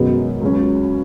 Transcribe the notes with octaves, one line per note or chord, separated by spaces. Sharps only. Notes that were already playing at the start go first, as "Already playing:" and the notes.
Already playing: F#2 B2 D#3 G#3 B3
C#2 C#3 F#3 C#4